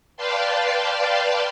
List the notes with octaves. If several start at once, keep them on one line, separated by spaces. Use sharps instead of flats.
B4 D5 F5 G5 A5 C6